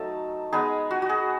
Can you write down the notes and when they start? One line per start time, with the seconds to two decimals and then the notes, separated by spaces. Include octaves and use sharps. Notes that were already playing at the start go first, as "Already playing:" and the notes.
Already playing: F#3 A3 D#4 A4
0.52 G#3 B3 D#4 G#4
0.91 F#4
1.02 F#4
1.09 G#4